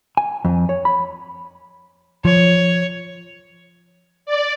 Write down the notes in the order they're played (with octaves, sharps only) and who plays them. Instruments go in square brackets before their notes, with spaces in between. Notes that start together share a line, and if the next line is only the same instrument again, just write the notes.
[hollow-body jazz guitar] G#5
F2
C#5
B5
[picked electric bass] F3 [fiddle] C#5
[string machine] D5